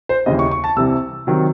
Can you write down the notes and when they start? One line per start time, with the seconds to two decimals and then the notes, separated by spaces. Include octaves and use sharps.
0.09 C5
0.26 D#2 C#3 E3 D#5
0.39 C#6
0.51 C#6
0.64 A5
0.76 C2 C3 E3 E6
1.27 C3 D#3 F#3